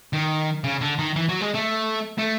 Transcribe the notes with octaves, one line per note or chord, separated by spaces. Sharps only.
D#3
C#3
D3
D#3
E3
F#3
G#3
A3
A3